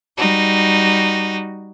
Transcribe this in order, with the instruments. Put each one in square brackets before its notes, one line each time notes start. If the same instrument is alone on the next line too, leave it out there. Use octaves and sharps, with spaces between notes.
[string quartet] G3 D#4 F#4